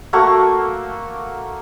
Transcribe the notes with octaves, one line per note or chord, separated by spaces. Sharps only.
A3 A#3 F#4 C#6